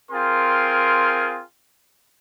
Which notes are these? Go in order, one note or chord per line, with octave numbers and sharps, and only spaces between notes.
C4 F4 G#4 A#4 G5 C6